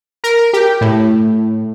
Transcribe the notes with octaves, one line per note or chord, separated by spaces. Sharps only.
A#4
G4
A2